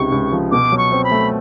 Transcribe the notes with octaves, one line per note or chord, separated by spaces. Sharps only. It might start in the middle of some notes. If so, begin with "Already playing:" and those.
Already playing: C#2 C3 D#4 C#6
C#2
F3
B2 D6
F#3
C#6
C4
B5
A3